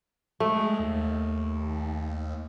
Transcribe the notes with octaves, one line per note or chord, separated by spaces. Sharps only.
G#3 A3
D#2